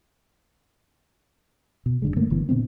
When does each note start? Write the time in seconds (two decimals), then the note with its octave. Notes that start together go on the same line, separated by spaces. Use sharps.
1.86 B2
2.02 F#1 D3 G#3
2.16 G2 D3 A3 A#3
2.30 G1 D3 E3 B3
2.49 A#2 D3 B3 C4